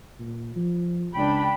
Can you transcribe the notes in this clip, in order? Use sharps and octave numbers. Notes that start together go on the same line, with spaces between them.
A#2
F3
C#2 D4 G5 B5